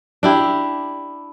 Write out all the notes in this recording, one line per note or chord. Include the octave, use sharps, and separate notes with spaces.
D4 E4 G4